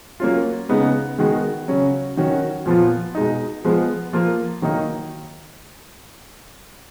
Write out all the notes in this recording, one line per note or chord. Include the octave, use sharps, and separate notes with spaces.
F#3 A#3 C#4 F4
C#3 G#3 B3 D#4
D#3 G#3 B3 F#4
C#3 F#3 C#4
D#3 F#3 C#4 F#4
A#2 F3 B3 F4
B2 G#3 D#4
F3 G#3 B3
F3 A#3 F4
D#3 F#3 A#3 D#4